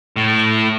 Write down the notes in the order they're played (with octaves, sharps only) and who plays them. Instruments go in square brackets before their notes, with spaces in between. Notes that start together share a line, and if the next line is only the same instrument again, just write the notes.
[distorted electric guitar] A2